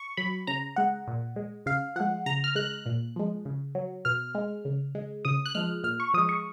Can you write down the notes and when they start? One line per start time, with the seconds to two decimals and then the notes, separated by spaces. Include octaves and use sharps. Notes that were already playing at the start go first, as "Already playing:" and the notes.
Already playing: C#6
0.17 F#3 B5
0.47 C#3 A#5
0.76 G#3 F#5
1.07 A#2
1.36 G#3
1.66 C#3 F5
1.96 F3 G#3 F#5
2.26 C#3 A#5
2.44 F6
2.55 G#3 F#6
2.86 A#2
3.16 F3 G#3
3.45 C#3
3.75 F#3
4.05 B2 F6
4.35 G#3
4.65 C#3
4.95 G#3
5.25 C#3 D#6
5.46 F#6
5.55 F3 G#3 F6
5.84 A#2 F6
6.00 C#6
6.14 F3 G#3 D#6
6.29 C#6